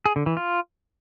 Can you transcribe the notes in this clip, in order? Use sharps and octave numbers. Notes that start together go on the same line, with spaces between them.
G#4
D3
E3
F4